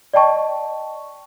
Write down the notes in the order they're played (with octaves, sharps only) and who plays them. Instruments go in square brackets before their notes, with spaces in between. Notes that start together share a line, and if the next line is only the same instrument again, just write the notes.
[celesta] D5 D#5 G5 A5 C#6